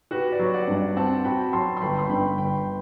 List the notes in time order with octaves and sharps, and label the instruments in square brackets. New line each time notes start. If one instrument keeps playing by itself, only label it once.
[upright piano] F#4 [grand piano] G4 B4
[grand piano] B4 D5
[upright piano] F#3
[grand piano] D5 F#5
[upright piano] G2
[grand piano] D5 F#5
[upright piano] C4 [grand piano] F#5 A5
[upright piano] F#4 [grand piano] G5 B5
[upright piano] F#3 [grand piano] A5 C6
[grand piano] C6
[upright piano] G1 [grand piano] G5 B5
[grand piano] C6
[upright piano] G2 [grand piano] G5 B5
[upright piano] G1 [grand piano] G5 B5